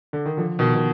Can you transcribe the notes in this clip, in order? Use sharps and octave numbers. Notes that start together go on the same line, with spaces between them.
D3
D#3
D3 F3
B2 D#3
B2